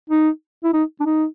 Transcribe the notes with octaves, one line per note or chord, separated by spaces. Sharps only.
D#4
E4
D#4
D4
D#4